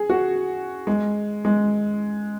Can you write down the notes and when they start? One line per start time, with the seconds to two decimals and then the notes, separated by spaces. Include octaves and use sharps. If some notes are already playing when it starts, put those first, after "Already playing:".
Already playing: G#4
0.10 F#4
0.87 G#3
1.45 G#3